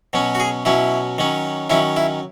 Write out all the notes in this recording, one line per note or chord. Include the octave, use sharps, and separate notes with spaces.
B2 F#3 C#4
F#4
G#4
B2 F#3 C#4 E4
D#3 F#3 C#4
D#3 F#3 C#4 E4
E4